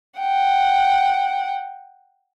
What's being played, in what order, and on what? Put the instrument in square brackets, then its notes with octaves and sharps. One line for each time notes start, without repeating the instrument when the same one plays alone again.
[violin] F#5 G5